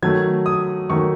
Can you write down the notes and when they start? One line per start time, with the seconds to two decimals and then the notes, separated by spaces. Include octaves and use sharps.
0.02 D#3 F#3 A3 G#6
0.46 D#6
0.90 D#3 F#3 A3 C#6